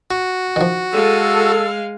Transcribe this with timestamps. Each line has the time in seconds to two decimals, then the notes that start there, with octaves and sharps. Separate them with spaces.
0.10 F#4 C#6
0.56 D#3 F3
0.92 G#3 A4 F5 E6